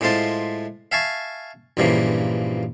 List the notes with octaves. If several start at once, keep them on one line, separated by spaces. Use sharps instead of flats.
A2 G#3 A3 F4 C5 A5
E5 F5 G#5 A5 C#6
A#1 G2 C#3 E3 F3 A#3